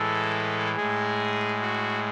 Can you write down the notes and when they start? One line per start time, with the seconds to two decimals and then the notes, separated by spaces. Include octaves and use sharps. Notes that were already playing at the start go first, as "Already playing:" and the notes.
Already playing: A2 E3 G#3 A4
0.77 A2 G#3 G#4
1.61 F#4